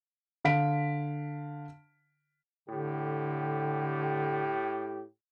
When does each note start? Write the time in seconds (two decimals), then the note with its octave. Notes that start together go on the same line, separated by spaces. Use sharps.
0.45 D3 F5 B6 D7
2.69 A2 D3 G4